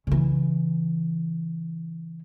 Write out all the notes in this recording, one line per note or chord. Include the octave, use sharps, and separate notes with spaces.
C#3 E3